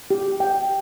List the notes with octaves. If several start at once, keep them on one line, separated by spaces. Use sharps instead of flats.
G4
G5